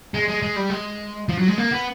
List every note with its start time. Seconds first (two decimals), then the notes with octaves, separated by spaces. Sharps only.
0.14 G#3
0.28 G#3
0.42 G#3
0.56 G3
0.70 G#3
1.29 F3
1.38 F#3
1.48 G#3
1.58 A#3
1.72 B3